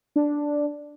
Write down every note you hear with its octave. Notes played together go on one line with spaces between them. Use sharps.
D4